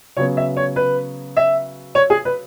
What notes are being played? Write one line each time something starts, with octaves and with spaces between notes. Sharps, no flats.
C#3 F#3 B3 C#5
E5
C#5
B4
E5
C#5
G#4
B4